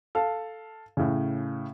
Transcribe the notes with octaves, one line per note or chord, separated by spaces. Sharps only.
A4 F5
A2 C#3